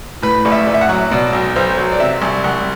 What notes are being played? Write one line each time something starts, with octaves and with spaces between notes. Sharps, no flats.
A2 B4
A1
E5
A1
E5
F#5
F#3
B2 D5
B1
B1 C5
F#3
D5
C3 E5
C2
C2 F#5